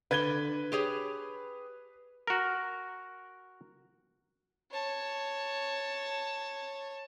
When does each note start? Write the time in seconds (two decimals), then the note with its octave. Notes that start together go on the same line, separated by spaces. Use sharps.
0.11 D3 B4 G#6 G7
0.72 G4 G#4 C#5
2.27 F#4 A#4
4.72 C#5 A5